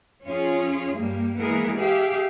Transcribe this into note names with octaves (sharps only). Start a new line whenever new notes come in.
F2 C#4 F4 G#4
G2 G3 A#3
E3 G#3 A#3 B3 G#4 A#4
G4 G#4 E5 F5